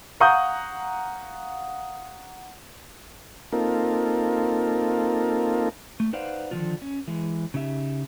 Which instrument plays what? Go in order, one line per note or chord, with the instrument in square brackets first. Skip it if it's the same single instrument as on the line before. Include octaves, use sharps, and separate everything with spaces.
[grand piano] F5 F#5 A#5 C#6 D#6 G6
[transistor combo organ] A#3 C4 D#4 F4 A4 A#4
[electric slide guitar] A3
D#4 B4 C5 D5 F5 F#5
D3 D#3 F3 D4 F4
C#4
E3 G#3
C#3 D#4 G4 E5